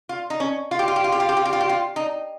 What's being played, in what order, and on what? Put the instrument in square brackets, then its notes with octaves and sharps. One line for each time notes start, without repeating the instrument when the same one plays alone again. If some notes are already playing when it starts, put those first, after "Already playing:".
[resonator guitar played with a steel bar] F4
D#4
C#4
F4
G4
F4
G4
F4
G4
F4
G4
F4
G4
F4
G4
F4
D#4